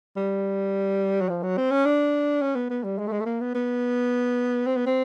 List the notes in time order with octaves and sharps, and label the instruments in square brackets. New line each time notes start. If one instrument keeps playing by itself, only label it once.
[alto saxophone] G3
F#3
F3
F#3
C4
C#4
D4
C#4
B3
B3
G3
G#3
A3
G#3
A3
A#3
B3
B3
C4
B3
C4